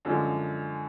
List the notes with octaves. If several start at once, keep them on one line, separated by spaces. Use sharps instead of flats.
F#2 D3 F3 G#3 D4